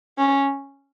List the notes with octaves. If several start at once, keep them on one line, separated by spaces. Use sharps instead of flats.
C#4